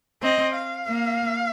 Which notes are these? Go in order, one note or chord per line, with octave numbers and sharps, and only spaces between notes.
C4 D#5
F5
A#3